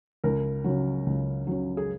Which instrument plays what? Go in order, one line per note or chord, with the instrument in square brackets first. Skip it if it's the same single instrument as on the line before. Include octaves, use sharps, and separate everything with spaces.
[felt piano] C#2 A#4
C#3 F#3
C#2
C#3 F#3
G#4